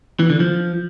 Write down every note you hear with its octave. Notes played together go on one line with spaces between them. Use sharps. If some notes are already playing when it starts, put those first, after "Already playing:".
E3
D3
F3